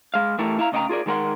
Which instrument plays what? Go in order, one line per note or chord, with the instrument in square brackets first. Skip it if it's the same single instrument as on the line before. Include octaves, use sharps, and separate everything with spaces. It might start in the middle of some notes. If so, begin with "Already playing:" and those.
[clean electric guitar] G#3 F5
E3 A3 E4 G4 A4 A#4
E4 F5 A#5
D2 C#3 D#5 F#5 G5 A#5
F4 G#4 A#4 D5
D#3 G#3 A4 A#4 F#5 C6